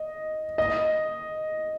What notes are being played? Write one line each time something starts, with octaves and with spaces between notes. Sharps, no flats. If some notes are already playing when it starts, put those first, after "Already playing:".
Already playing: D#5
D#5